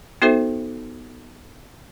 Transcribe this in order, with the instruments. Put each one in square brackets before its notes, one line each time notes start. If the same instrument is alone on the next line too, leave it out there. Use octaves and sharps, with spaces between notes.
[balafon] B3 D#4 F#4 A4 C5 E5